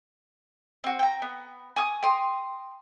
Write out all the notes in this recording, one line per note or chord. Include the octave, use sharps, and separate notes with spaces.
C4 F#4
G5 A#5
B3
G#5 C#6 D#6
G5 A#5 C6 D#6